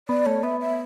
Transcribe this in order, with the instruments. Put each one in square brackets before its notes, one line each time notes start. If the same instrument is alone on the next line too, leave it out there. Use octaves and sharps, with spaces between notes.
[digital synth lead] B3 [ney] D5
[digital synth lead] A3 [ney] C#5
[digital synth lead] B3 [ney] E5
[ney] E5